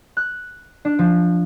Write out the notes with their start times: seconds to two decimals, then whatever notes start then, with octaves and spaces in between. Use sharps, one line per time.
0.17 F#6
0.85 D4
0.99 F3